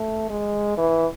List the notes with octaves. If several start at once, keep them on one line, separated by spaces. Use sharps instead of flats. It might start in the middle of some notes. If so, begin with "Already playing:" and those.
Already playing: A3
G#3
E3